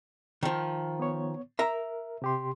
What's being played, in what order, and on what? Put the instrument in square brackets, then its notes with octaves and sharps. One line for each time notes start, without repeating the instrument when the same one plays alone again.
[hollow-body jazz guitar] D#3 F3
[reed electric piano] B3 C#5
[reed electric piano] A#4 [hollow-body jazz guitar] E5 A#5
[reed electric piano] C3 G4 C6